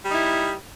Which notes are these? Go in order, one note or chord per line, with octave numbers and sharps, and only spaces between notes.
G3 D#4 E4